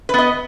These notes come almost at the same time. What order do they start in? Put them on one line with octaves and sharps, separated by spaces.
B4 B3 D#5